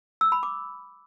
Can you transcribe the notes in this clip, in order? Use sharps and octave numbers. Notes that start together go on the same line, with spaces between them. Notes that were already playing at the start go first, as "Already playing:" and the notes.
E6
B5
D6